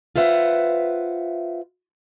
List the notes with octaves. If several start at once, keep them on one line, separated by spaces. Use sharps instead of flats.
F4 B4 C5 E5 F#5